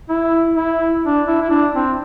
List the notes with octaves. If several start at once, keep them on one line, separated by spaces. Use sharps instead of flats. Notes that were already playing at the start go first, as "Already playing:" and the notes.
E4
E4
D4
E4
E4
D4
C4